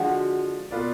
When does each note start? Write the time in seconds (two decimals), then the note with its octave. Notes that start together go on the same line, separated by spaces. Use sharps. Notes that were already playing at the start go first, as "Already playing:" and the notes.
Already playing: D3 F3 G#3 F#4
0.71 B2 A#3 F4 B4 D5